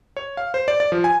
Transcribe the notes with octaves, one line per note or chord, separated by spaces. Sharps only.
C#5
F5
C5
D5
D5
F3
G#5